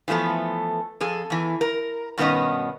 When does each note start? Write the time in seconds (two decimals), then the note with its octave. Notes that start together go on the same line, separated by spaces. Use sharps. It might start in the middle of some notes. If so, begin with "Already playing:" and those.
0.08 E3 F3 A3 B3 A4
1.01 F2 G#4 A4
1.30 E2 E3
1.61 A#4
2.18 G2 B2 D#3 B3 C#4 D#5